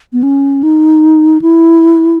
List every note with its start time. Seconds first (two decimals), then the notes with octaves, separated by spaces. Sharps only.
0.13 B3
0.23 C#4
0.63 D#4
1.42 E4